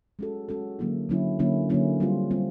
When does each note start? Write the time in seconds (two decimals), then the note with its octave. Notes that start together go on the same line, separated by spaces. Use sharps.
0.19 G#3 C#4 F#4 A4
0.49 G#3 C#4 F#4 A4
0.79 D3 F#3 A#3 C#4 E4
1.09 D3 F#3 A#3 C#4 E4
1.39 D3 F#3 A#3 C#4 E4
1.69 D3 F#3 A#3 C#4 E4
2.00 G3 C4 F4
2.31 G3 C4 F4